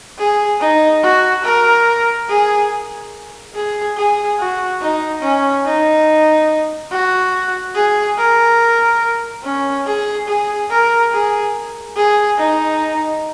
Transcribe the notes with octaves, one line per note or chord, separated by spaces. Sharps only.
G#4
D#4
F#4
A#4
G#4
G#4
G#4
F#4
D#4
C#4
D#4
F#4
G#4
A#4
C#4
G#4
G#4
A#4
G#4
G#4
D#4